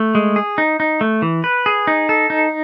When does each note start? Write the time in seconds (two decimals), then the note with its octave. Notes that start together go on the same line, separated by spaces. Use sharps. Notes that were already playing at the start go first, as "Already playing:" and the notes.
Already playing: A3
0.15 G#3
0.36 G#4
0.58 D#4
0.80 D#4
1.01 A3
1.22 E3
1.44 B4
1.66 G#4
1.87 D#4
2.09 A4
2.30 D#4